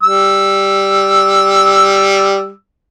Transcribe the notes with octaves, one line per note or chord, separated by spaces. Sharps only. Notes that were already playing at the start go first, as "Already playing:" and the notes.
G3 E6